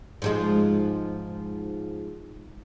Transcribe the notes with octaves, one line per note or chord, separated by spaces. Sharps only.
G#2 F3 G#3